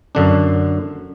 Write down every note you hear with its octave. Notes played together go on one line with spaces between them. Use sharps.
F#2 D3 D4